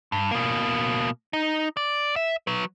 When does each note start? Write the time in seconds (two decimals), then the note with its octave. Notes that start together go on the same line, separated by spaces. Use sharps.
0.12 G2
0.31 B2 A#3
1.33 D#4
1.77 D5
2.16 E5
2.47 F#3 B4